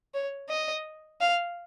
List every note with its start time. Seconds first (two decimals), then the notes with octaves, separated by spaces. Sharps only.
0.14 C#5
0.50 D#5
1.21 F5